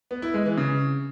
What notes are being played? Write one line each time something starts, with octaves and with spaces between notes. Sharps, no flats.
B3
E4
G#3
E3
C#3